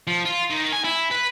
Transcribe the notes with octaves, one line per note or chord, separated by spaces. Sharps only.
F3
F4
D#3
G#5
E4
B4